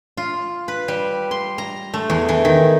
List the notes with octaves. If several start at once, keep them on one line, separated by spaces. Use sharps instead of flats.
F4
B4
G3
C6
A#5
A3
E2
E3
D#3